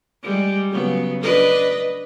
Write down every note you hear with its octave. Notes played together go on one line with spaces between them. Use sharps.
G3 G#3
C#3 F#3 B3
D4 B4 D#5